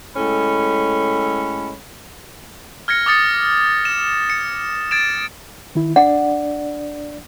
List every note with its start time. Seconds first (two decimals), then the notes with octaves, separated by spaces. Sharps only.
0.16 A2 G#3 C#4 A4 B5
2.88 F6 G#6 A#6 C#7
3.06 D6 D#6 A6 C#7
3.85 E7
4.30 C#7
4.91 G#6 A6 D7 E7
5.75 D#3 E4
5.96 D4 D5 F#5